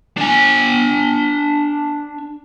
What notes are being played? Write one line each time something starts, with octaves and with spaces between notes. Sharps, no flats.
D4 G#5